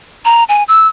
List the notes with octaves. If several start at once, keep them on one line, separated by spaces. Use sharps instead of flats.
A#5
G#5
E6